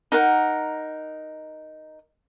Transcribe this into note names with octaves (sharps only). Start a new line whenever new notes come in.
D#4 A#4 F#5